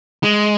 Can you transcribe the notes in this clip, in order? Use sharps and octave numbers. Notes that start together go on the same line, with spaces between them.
G#3